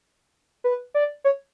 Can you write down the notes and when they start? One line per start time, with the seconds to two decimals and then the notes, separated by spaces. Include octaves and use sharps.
0.64 B4
0.94 D5
1.24 C#5